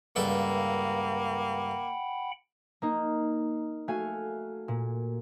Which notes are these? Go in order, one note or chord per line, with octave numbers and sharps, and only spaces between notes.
C#2 G2 A#3 A4 F#5 G5 B5
A#3 D#4
A3 F#4 F5 G#5
A#2